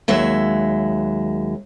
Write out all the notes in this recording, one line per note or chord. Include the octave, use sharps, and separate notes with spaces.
D#2 F#3 G#3 E5